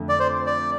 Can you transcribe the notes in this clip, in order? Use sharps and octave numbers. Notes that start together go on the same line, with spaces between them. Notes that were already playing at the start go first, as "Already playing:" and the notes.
Already playing: F2 D3 A3
D5
C5
D5